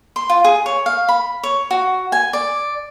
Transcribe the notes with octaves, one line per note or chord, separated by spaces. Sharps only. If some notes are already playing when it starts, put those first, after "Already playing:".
C6
F4
G#4
C#5
F5
B5
C#5
F#4
G#5
D5